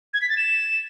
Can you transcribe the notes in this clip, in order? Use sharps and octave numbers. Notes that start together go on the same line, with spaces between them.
G#6
B6
A6
E7